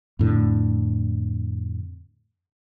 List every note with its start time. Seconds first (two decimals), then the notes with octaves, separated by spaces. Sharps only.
0.19 F2 A2 D3